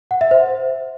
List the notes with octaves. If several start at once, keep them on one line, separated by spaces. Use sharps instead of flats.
F#5
E5
C5